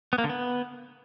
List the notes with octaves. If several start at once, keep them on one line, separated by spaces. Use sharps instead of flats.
B3
A#3
D3
B3